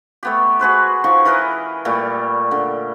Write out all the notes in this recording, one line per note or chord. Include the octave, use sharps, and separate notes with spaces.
A3 B3 G4
F#4 G#4 B4 C5
F3 D#4 C#6
E3 A#4 B4 D#5
A#2 G3 A3
D3